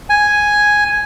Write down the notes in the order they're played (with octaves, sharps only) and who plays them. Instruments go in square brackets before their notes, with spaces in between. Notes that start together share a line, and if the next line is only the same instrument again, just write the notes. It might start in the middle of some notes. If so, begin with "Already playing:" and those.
[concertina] G#5